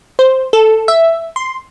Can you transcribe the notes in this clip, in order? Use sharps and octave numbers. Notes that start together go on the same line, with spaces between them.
C5
A4
E5
C6